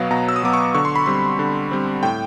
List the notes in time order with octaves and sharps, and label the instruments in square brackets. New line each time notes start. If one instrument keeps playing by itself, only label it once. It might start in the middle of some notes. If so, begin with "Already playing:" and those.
Already playing: [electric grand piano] B2 F#3 B3 F5
B2 A#5
E6
D#6
F#3 B3 D6
C#6
D3 C#6
C6
B5
G3 C4 C6
D3
G3 C4
A2 G5